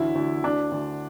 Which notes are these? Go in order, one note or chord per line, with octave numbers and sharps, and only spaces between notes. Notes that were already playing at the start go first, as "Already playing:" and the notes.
Already playing: A1 D2 E4
D2
D2 D4
D2